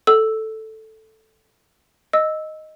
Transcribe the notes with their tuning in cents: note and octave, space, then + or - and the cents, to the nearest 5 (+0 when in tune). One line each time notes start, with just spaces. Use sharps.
A4 +0 E6 +0
D#5 +0 E6 -10